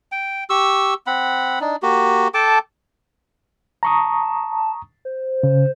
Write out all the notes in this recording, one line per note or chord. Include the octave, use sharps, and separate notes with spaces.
G5
G4 C#6 E6
C4 F#5 B5
D4 D#4
A#3 F#4 G4
A4 G5 A5 D6
A5 A#5 C#6 D#6
C5
C#3